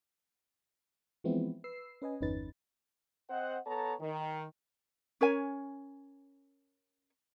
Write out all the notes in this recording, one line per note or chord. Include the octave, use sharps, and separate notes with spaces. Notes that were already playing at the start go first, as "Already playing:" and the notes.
E3 F3 G#3 B3 C4 E4
B4 E6 C7
C#4 B4 D#5 G#5
G1 E2 C#4 D#4 B4 A6
C4 C5 D#5 F#5
B3 A4 C#5 A5 A#5
D#3
C#4 A#4 C#5 G#5